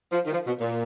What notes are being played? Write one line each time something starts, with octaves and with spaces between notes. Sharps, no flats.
F3
D#3
F3
B2
A#2